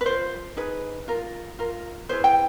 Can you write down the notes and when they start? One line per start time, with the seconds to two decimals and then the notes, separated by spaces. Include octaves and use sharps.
0.01 B4
0.05 F4 A#4 C5
0.57 D#4 G#4 B4
1.08 F4 A#4
1.59 F4 A#4
2.09 E4 G#4 B4 C5
2.24 G5